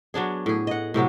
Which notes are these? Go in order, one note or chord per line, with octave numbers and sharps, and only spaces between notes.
F#3 B3 D4 G#4
A2 G#4
D#5 F#5
A2 C3 F#3 B3